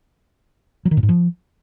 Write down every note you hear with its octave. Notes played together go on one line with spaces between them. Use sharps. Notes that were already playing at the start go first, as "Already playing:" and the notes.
F#3
D#3
A2
G#2
F3